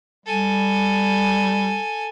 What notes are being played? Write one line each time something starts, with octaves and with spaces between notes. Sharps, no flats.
G3 A4 G#5